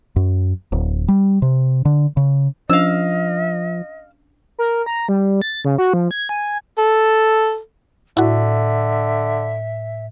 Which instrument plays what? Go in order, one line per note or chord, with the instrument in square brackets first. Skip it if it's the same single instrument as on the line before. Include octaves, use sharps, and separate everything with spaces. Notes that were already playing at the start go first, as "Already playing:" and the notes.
[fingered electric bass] F#2
D1
G3
C3
D3
C#3
[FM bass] F3 [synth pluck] C#4 D4 [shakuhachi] D#5 [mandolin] F5 E6
[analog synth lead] A#4
A#5
G3
A6
C#3
F#4
F3
G#6
G#5
[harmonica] A4
[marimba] A2 [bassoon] D3 [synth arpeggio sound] E4 F#4 [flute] E5